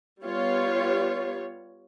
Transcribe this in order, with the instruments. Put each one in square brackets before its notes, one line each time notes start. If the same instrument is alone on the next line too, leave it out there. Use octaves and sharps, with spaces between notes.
[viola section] G3 B3 F4 C#5